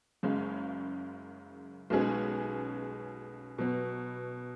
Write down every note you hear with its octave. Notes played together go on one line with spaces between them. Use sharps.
F#1 F#2 C#3 G#3 C#4
B1 B2 G#3 C#4 G#4
B2 F#3 B3